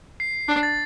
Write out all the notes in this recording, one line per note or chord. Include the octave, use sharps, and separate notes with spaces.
C7
D4
A6